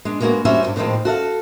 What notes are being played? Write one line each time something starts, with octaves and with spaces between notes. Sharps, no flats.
G#3 D4
G3 G#3 A#3 B3 F#4
G3 C#4 F#4 C5 E5
D2 G2
A2 D3 D#3 F3 G#3 C4
F#4 A4 E5 F5